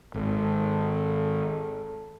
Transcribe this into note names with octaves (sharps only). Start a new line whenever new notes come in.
G#1 A4